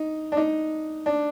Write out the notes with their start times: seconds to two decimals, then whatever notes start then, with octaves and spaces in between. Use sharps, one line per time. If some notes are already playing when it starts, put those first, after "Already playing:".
Already playing: D#4
0.32 D4
0.37 D#4
1.06 D4